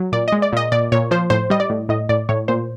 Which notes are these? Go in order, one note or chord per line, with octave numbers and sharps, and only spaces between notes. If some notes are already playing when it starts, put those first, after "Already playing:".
Already playing: F#3
A#2 D5
G#3 D#5
D5
A#2 D#5
A#2 D5
A#2 C#5
F3 C5
A2 C5
G3 D#5
D5
A2
A2 D#5
A2 D5
A2 C#5
A#2 C5